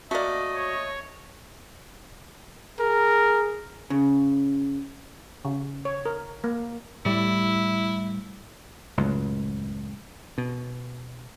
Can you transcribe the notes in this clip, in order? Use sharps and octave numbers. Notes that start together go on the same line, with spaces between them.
A3 A#3 F#4 D5 D#5
C#5
G#4 A#4
C#3
C#3
C#5
A#4
A#3
A2 G3 E4
C#2 F#2 A2
B2